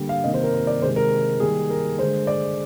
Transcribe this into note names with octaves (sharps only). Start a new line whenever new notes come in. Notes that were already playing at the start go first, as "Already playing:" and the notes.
Already playing: D3 G3 A#3
F5
C3 D#3 A#3 D#5
C5
A#4
C5
D5
C3 D#3 G#3 C5
A#4
D#3 G3 A#3 G#4
A#4
D3 G#3 C5
D5